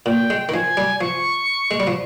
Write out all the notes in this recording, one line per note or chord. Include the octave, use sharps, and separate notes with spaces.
A#2 G5
G#3
D#3
F3 G#5
G3
F3 C#6
G#3
G3
F3